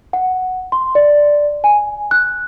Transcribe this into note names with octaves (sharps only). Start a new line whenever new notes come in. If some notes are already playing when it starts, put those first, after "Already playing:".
F#5
C6
D5
G#5
F#6